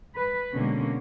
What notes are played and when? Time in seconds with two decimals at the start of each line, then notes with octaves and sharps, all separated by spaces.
0.16 B4
0.53 B2 D3 G#3 A#3 C#4